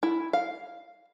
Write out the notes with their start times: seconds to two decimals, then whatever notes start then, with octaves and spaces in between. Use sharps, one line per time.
0.03 E4
0.33 F5